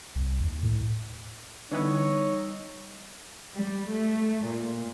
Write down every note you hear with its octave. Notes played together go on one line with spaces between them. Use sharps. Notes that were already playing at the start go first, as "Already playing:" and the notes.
C2
D#2
A2
D3 E3 G3 B3 D#4 C#5 D#5 E6
G3
A3
A#2